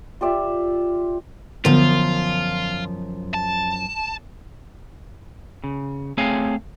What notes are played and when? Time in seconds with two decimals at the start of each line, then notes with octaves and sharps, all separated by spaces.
0.21 F4 G4 D5 E5
1.65 F#2 D3 F3 B3 F4
3.34 A5
5.64 C#3
6.18 A3 C4 G#4 C#5 F5 G#5